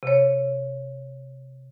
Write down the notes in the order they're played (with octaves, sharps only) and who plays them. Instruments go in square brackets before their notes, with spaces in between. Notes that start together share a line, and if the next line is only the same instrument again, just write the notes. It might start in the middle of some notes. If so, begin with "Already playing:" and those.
[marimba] C3 C#5